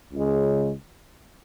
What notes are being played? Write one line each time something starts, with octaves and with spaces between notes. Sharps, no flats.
C#2 C#3 G#3